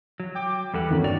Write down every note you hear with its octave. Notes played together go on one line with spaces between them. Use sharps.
F#3
G5 D6
E2 G3 F#4 A4
G1 D#3 C#4
F#4 D5 F7